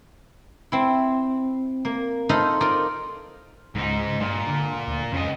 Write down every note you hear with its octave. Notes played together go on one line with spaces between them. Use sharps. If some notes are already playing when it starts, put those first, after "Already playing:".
C4 E4
A#3
D#4 F4 A4 C5 D#5 B5
D#4 F4 A#4 D5
C#2 G#2 D#4
G2 A#2
D3
D2
F2 C#3 D#5